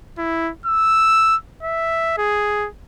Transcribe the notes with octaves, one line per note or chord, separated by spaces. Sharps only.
E4
E6
E5
G#4